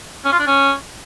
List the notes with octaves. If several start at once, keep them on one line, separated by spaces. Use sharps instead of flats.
C#4
F4
D4
C#4